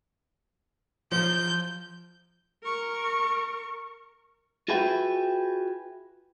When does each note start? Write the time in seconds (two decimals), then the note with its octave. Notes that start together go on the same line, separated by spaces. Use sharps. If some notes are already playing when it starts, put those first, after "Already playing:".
1.12 F3 G6
2.63 A#4 C#6
4.68 F4 F#4 G#4 B4 E5 G5